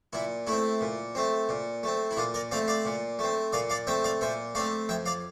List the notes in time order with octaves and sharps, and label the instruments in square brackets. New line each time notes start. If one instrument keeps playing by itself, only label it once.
[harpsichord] A#2 E4
A3 C4 E4
A#2
A3 C4
A#2
A3 C4
E4
A#2 D4 F4
A#4 D5
A3 C4 D5 F5
D5 F5
A#2
A3 C4
A#2 D5 F5
D5 F5
A3 C4 E5 G5
D5 F5
A#2 C5 E5
A3 C4 D5 F5
F2 E5 G5
D5 F5